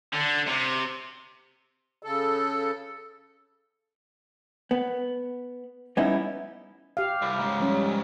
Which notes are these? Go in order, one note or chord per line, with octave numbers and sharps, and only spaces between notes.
D3
C3
C#3 A4
B3
G3 B3 C#4 D#4 E4
G4 F5
C2
G#2 C#3
F3 G3 C#4